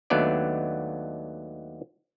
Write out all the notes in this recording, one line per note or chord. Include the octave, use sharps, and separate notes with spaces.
D#2 F#3 A3 B3 D4 D5